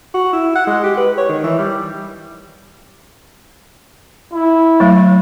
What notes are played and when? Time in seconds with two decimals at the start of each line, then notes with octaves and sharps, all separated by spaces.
0.14 F#4
0.33 E4
0.56 F#5
0.67 G#3
0.84 G4
0.97 B4
1.18 C#5
1.29 D#3
1.44 E3
1.59 G3
4.33 E4
4.80 F#3 A3